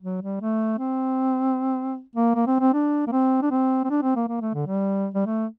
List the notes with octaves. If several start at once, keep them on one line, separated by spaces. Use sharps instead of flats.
F#3
G3
A3
C4
A#3
A#3
C4
C4
D4
A#3
C4
D4
C4
C4
D4
C4
A#3
A#3
A3
D3
G3
G3
A3